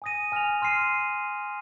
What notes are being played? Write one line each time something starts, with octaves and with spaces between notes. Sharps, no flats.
G#5 D#6 A#6 D#7
G#5 F6 A#6 F7
C6 F6 C7 D#7